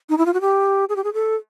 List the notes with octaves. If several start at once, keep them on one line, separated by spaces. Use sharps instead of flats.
D#4
E4
F4
F#4
G4
G#4
G4
G#4
A4